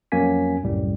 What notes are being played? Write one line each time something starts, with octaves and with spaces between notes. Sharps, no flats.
F2 F#3 A#3 C#4 G#5 B6
C2 F#2 A2 G3